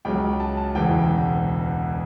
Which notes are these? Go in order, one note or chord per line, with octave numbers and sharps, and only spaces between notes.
C#2 C#3 F#3 G5
A5
A5
E1 D2 C#3 E3 G5